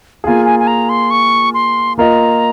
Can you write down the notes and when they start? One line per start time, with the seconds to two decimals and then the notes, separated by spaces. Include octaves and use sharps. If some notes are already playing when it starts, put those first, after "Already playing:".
0.24 A#3 F4 G#4 G#5
0.45 G#5
0.59 G#5
0.67 A#5
0.89 C6
1.11 C#6
1.54 C6
1.98 A#3 F4 A#4 D#5 A#5